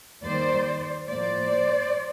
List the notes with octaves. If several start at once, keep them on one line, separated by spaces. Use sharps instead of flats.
D#2 D#3 G3 C5 D5
A2 F3 A#3 C5 D5